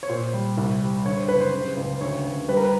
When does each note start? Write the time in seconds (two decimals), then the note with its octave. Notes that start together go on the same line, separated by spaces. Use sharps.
0.03 C#5
0.09 A#2 C5
0.33 G3
0.57 C2
0.81 G3
1.06 D3 C#5
1.17 C5
1.28 F#1 B4
1.40 C5
1.54 C#3
1.76 C#2
2.01 D2 C#5
2.25 D2
2.48 G3 B4
2.57 A#4
2.64 B4